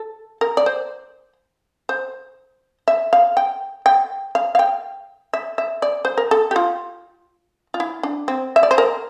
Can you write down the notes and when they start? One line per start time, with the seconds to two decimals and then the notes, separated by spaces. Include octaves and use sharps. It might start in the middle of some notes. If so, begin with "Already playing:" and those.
Already playing: A4
0.41 A#4
0.57 D5
0.66 C5
1.89 C5
2.88 E5
3.13 F5
3.37 G5
3.86 G5
4.35 F5
4.55 F5
4.59 G5
5.33 E5
5.58 E5
5.82 D5
6.05 C5
6.18 A#4
6.31 A4
6.51 G4
6.56 F4
7.74 F4
7.80 E4
8.03 D4
8.28 C4
8.56 E5
8.63 D5
8.71 C5
8.78 A#4